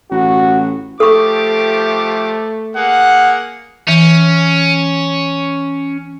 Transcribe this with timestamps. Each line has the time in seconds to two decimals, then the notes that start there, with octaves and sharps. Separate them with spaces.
0.11 A1 F#4
1.00 F3 A3 G4 A4 C#6 D6
2.76 A#3 G#4 F#5
3.88 E3 C#4